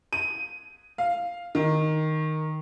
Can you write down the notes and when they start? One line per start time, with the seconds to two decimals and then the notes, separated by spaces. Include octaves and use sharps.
0.13 D#7
0.98 F5
1.55 D#3